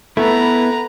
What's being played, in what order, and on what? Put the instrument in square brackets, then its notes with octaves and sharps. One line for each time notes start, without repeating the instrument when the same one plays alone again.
[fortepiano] A3 [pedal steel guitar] B3 E4 [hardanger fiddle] B4 A#5